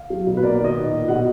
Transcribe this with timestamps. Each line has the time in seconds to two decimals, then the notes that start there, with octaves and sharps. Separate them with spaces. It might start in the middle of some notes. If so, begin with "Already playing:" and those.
Already playing: F5
0.10 F#3
0.27 B2
0.37 B4
0.43 A#3 D5
0.54 D#3 D5
0.64 D#5
0.76 A#2
0.92 A#2
1.08 B2 F#5